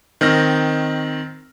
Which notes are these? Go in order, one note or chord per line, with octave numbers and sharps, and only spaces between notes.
D#3 C4 F6 A#6